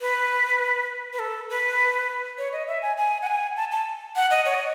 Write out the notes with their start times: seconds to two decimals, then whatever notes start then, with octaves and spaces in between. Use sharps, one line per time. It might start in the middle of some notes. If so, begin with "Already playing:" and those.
0.01 B4
1.13 B4
1.19 A4
1.50 B4
2.38 C#5
2.52 D#5
2.68 E5
2.82 G#5
2.97 G#5
3.22 F#5
3.27 G#5
3.57 A5
3.72 A5
4.16 F#5
4.31 D#5
4.45 C#5
4.54 D#5